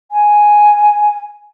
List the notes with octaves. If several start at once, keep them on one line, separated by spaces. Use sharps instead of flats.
G#5